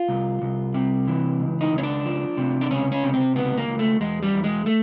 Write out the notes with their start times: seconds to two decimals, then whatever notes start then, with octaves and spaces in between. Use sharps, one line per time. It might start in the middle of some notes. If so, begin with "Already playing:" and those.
Already playing: F4
0.09 C2
0.42 C2
0.74 C3
1.08 E3
1.40 C#2
1.61 D#4
1.73 C#2
1.78 C#4
1.83 D4
2.06 F3
2.37 C3
2.61 D4
2.70 C#2 C#4
2.92 C#4
3.03 C3
3.13 C4
3.35 C#2 B3
3.57 A#3
3.68 C#2
3.79 A3
4.00 E2 G#3
4.23 G3
4.34 E2
4.44 G#3
4.66 A3